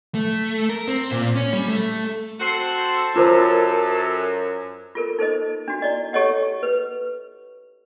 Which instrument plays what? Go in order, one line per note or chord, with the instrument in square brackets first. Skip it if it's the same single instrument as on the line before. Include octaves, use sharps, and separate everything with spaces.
[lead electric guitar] A3
A#4
C4
A#2
C#4
G3
A3
[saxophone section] C4 F#4 C5 [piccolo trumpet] A4
[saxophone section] F#2 [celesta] F4 A#4 C5
[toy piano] F4 A4 A#4
D#4 A4 C5 D#5
D4 F#4
E4 D5 D#5
G4 A4 C#5 D#5 F#5
B4